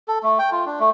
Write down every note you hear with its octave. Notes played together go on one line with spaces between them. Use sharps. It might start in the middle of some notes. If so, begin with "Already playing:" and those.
A4
A3
G5
F4
D4
A3